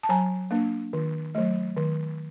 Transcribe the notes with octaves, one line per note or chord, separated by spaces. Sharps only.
A5
F#3 G#5 A#5
A#3 D4
D#3
F#3 A3
D#3